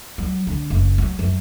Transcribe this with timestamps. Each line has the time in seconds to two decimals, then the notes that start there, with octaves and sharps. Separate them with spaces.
0.18 F#3
0.47 D3
0.70 F#1
0.98 F#3
1.19 F#2